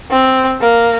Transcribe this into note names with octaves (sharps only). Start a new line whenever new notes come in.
C4
A#3